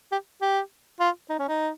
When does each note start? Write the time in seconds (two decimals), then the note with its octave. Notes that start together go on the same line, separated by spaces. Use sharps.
0.12 G4
0.42 G4
1.00 F4
1.30 D#4
1.39 C#4
1.49 D#4